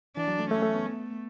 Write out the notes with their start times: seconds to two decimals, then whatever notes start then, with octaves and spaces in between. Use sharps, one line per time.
0.16 E3 D4
0.28 F#3
0.39 A3
0.51 A3 C#4
0.62 A3
0.74 B3
0.86 A3